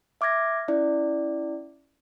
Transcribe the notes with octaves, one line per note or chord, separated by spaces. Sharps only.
E5 D6 F6 G#6 A#6
C#4 E4 D5